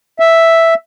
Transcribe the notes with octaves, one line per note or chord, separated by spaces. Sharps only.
E5